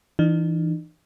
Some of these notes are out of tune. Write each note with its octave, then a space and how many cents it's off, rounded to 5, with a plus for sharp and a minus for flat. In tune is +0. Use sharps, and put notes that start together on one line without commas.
E3 +0 D#4 -45